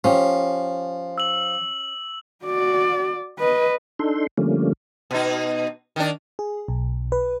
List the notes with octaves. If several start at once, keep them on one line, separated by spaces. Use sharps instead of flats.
F3 C#4 G4
E6 F#7
F#4 D5
B4 D#5
D4 D#4 A4 C6
D3 F3 G3 A3 A#3 C#4
B2 D#4
D#3 D4
G#4
B1
B4